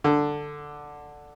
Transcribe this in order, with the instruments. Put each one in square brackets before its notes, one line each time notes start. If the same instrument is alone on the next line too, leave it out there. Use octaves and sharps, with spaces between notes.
[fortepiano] D3